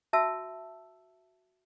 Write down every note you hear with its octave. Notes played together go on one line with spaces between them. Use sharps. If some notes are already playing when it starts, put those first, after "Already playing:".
F#4 E5 A5 E6